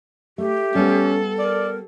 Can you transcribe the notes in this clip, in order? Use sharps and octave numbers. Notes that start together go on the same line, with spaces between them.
A3 G4
G3 B3 C#4 A4
A#4 D5